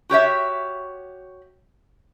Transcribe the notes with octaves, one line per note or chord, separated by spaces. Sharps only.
F#4 G4 C#5 E5